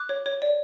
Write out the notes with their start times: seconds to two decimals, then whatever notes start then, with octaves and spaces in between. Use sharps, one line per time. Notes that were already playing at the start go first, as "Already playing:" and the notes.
Already playing: D6 F#6
0.09 C#5
0.26 C#5
0.42 D5